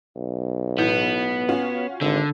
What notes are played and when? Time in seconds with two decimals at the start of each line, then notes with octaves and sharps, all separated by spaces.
0.16 B1
0.78 A2 E3 B3 G6
1.48 C#4 F4 F#4
2.01 G#1 D3